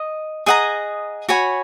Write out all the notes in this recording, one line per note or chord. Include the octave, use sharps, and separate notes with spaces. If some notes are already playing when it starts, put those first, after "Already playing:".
Already playing: D#5
G#4 D#5 F#5 A#5
F#4 C#5 G#5 B5